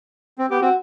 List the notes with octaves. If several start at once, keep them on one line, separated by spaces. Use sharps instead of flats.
C4
B3 G4
C4 F#4